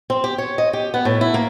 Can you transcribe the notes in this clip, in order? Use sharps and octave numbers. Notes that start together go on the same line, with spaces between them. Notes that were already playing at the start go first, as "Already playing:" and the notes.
C4
G4
C#5
D#5
G4
B3
A2
E4
A#3